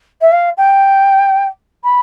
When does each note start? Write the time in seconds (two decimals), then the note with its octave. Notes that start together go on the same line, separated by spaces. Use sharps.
0.21 E5
0.32 F5
0.57 G5
1.83 B5